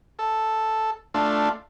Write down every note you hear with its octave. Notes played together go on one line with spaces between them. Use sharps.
A4
A3 D4 F4